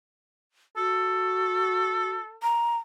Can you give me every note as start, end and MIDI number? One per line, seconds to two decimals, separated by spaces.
0.77 2.15 66
0.77 2.38 69
2.43 2.77 82